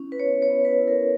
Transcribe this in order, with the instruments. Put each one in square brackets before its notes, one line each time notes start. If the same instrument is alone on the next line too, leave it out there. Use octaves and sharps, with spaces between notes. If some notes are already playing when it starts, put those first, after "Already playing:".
Already playing: [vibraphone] C#4 E4
B4
B3 C#5
C#5
B3
B4
E4
A#4